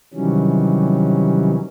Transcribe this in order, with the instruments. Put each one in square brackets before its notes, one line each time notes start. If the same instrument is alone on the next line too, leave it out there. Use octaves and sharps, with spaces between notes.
[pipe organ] C3 D#3 E3 F#3 G3 C#4